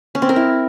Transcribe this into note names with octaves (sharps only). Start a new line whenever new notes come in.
C#4
C4
A#4
E4